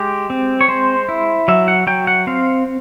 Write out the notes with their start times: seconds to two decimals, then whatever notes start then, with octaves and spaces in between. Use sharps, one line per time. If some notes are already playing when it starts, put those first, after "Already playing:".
Already playing: G#3 G4
0.30 C4
0.61 C#5
0.68 G#3 C5
1.09 E4
1.48 F#3 E5
1.68 F#5
1.87 F#3 G5
2.07 F#5
2.27 C4 F5